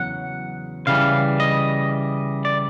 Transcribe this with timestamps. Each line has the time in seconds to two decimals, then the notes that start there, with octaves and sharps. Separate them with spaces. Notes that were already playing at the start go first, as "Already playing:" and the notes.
Already playing: E2 C#3 F#3 F#5
0.87 C#3 E3 G3 F5
1.40 D#5
2.45 D5